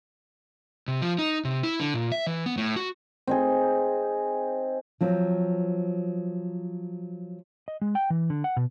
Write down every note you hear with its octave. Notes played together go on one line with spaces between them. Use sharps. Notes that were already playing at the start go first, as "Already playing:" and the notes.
C3
F3
D#4
C3
E4
D3
A#2
E5
E3
B3
A2
F#4
C4 D#4 G#4
F3 F#3 C4
D#5
G#3
G5
E3
D3
F#5
B2